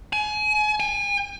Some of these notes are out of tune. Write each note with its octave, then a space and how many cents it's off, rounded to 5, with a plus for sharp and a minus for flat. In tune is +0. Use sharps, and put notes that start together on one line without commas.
G#5 +30
G#5 -40